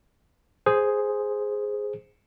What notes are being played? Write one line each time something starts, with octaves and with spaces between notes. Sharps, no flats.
G#4 C5